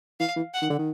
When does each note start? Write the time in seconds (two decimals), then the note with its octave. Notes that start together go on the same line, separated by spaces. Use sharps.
0.20 E3 F5
0.36 E3
0.54 F#5
0.61 D#3
0.70 D3
0.79 D#3